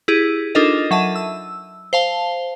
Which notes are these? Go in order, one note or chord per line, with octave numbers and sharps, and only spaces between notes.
E4 G4 G#4
D4 D#4 F4 A4 A#4 D#5
F#3 E5 A5 D#7
E6
C5 F5 A5